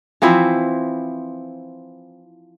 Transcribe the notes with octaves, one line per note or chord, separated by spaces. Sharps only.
E3 F3 C4 E4